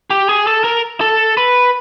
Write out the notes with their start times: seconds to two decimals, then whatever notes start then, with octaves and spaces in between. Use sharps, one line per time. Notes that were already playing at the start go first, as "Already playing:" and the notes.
0.10 G4
0.29 G#4
0.47 A4
0.64 A#4
1.01 A4
1.37 B4